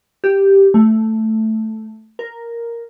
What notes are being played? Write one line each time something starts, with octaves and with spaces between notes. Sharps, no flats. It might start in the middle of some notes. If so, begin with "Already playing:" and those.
G4
A3
A#4